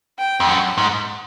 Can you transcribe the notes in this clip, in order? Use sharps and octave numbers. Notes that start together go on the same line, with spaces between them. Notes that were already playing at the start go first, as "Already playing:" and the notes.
G5
F2
F#2 F#5
G#2